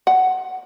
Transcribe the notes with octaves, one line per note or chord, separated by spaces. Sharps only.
F#5